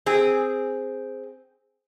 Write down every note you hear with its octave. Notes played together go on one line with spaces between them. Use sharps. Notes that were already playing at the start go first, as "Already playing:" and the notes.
C4 G#4